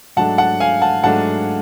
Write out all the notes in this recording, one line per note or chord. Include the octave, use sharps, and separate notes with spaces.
G#2 F#3 A3 D4 F#5 A5
F#5 A5
F5 G#5
F#5 A5
G#2 F#3 A3 D4 F#5 A5